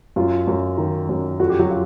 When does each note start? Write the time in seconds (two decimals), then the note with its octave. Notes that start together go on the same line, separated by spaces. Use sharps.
0.16 F#2 F4
0.47 F#2
0.78 D#3
1.09 F#2
1.40 F2 F#4
1.50 G4
1.59 F#3 F#4
1.70 F4